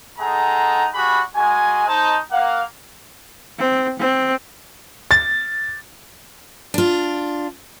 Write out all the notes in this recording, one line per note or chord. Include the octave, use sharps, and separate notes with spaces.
G#3 D#4 G#4 A4 F#5 A#5
G3 F#4 G#4 B5
G#3 F#4 G#5
D#4 C5 A5
A#3 F5 F#5
C4
C4
A6
D4 F4